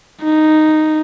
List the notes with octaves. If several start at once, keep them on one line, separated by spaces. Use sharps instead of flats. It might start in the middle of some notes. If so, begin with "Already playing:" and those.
D#4